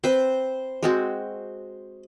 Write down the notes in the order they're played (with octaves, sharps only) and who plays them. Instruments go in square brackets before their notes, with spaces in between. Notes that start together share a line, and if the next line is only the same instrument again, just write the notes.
[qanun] C4 B4 [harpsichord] C5
[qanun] G#3 C4 F#4